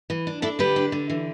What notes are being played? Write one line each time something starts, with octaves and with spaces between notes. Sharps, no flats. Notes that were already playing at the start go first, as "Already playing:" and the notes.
E3
D4
D4 E4 A4
D3 G4 B4
D4
D3
E3